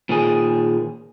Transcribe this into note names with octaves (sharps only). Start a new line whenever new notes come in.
A#2 D#3 G#4